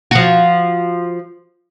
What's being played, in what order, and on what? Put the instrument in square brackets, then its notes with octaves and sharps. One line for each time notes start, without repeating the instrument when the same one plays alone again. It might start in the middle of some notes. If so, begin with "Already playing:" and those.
[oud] F3 F#4